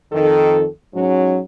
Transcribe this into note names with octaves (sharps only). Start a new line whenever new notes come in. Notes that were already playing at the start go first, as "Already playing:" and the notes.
F2 D#3 A4
G#2 F#3 C#4